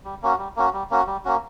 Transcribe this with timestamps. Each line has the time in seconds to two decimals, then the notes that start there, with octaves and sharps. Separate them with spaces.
0.05 G3
0.22 A#3 C#4 F#4
0.38 G3
0.56 A#3 C#4 F#4
0.73 G3
0.90 A#3 C#4 F#4
1.07 G3
1.25 A#3 C#4 F#4